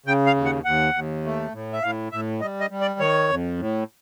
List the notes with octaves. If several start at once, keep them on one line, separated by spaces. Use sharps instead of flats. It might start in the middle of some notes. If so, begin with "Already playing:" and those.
C#3 G5
F5
D#2
F#5
D#2 F#5
D#2
A3
A2
E5
A2 F5
A2 E5
G3 D#5
D#5
G3
D5
D#3 C#5
F2
A2